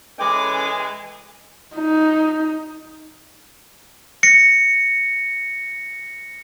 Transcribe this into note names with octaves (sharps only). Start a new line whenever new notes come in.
E3 G#3 C#4 A4 B4 G#5 D6
D#4
A#6 C#7